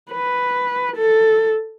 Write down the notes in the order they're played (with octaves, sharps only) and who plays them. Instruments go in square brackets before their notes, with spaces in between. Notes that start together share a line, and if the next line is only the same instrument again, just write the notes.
[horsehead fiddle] B4
A4